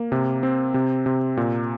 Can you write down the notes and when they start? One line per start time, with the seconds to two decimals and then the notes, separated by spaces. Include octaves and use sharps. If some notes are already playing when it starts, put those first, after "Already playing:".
Already playing: A#3
0.12 C3
0.43 C4
0.74 C3
1.06 C3
1.37 A#2